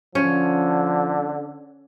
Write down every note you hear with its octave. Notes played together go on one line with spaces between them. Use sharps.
D3 F3 C#4